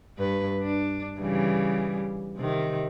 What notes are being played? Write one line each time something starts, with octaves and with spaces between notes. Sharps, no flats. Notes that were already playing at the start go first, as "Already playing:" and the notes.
G2 B4
D4
C#3 E3 G3
C3 D#3